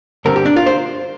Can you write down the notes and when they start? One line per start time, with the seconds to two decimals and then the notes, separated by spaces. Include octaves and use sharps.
0.25 G2 D3 G3 C4 A#4
0.36 G4
0.46 D4
0.56 F4
0.66 C5